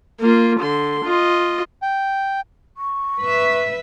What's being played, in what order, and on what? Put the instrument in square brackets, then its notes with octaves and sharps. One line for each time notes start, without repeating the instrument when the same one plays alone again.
[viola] A#3 F4
D3 C6
F4 D#5
[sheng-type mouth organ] G5
[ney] C#6
[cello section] B4 E5